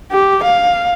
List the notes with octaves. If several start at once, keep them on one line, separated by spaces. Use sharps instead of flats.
G4
F5